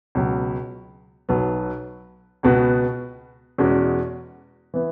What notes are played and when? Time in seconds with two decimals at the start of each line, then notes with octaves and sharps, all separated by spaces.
0.15 C#2 B2 F#3
1.29 B1 B2 F#3 B3
2.43 C#2 B2 B3 F#4
3.58 E2 B2 G#3 C#4 F#4
4.74 E3 B3